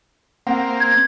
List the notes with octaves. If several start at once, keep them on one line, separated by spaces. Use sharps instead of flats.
A#3 C4 F#5
G#6